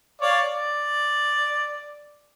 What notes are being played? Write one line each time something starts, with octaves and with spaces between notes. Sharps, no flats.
C#5 D5 F5
D5